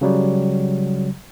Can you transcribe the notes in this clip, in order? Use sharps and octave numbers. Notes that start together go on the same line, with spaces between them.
C#3 F#3 G3